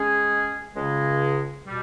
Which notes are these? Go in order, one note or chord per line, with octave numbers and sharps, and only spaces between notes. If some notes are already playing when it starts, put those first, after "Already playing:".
Already playing: G#3 C#4 G#4
C#2 C#3 G#3
B2 G3